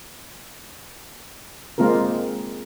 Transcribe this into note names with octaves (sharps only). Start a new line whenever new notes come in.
G#3 A#3 C4 F4 A#4